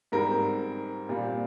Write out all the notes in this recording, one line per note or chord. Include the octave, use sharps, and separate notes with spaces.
G#2 G3 C4 A#4
A#2 G3 C4